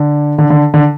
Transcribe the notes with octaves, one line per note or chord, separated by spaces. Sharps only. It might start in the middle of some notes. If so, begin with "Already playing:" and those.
Already playing: D3
D3
D3
D3